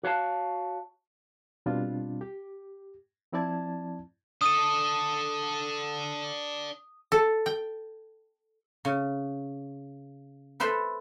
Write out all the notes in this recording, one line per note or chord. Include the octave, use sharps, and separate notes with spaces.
F#4 C#5 F5 A5
B2 G3 C4 D4 F4
G4
F3 C4 E4 D5 A5 G#6
D4 A4 D#6 D#7
A4
G5
C#3
A4 B4 C5 E5